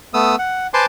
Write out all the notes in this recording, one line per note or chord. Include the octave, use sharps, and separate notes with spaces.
A3 B3 D#6 E6
F#5
B4 C5 G#5 A5 C6 D6